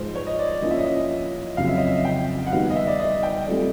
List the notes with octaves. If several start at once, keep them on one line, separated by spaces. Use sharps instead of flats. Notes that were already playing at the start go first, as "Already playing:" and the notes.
Already playing: G#2 F3 G#3 C5
C#5
D#5
D5
F3 A#3 C#4 E4 D#5
E5
D#5
F2 C#3 F#3 F5
E5
D#5
E5
G5
F#5
D#3 G3 B3 D#4 F#4 F5
D#5
E5
D5
D#5
G5
G3 C4 F4 A4 D5